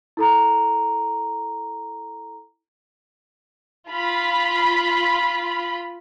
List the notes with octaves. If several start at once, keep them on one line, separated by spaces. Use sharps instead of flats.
E4 A4 A#5
F4 B5